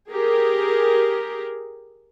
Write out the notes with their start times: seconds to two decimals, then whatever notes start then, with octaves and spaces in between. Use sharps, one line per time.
0.11 G4 G#4 A#4